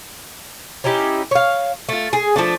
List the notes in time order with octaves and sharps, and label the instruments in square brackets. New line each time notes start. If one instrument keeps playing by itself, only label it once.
[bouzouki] C#4 D#4 E4 G4
C#5 F5
A3 F4
G#4
F3 A3 D4